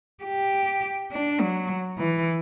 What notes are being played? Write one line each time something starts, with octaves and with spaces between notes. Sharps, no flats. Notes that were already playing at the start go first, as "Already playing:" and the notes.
G4
D4
F#3
E3